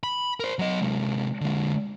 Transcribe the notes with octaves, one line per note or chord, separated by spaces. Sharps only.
B5
A#4 C5
F#3 D#5
C3 G#3
D3 G#3